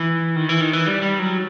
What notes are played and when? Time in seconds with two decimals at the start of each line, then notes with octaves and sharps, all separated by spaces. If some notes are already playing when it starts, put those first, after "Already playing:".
Already playing: E3
0.36 D#3
0.49 E3
0.61 D#3
0.73 E3
0.86 G3
1.02 G3
1.19 F#3